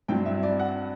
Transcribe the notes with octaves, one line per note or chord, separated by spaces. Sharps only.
G2 F#3 C4 E4 G5
E5
D5
F#5